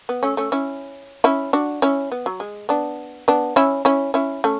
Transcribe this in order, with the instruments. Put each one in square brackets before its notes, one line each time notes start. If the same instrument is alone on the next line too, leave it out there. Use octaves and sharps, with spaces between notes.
[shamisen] B3
A3 C#4
A3 C#4
C#4 E4
C#4 E4
D4 F#4
C#4 E4
B3
F#3
G#3
B3 D4
B3 D4
C#4 E4
C#4 E4
C#4 E4
A3 C#4